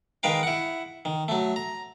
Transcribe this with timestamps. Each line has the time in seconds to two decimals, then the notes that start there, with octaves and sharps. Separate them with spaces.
0.23 D#3 G#3 A#4 B4 F5 G5
0.43 E4 F#5
1.05 D#3
1.28 F#3 A3
1.56 A#5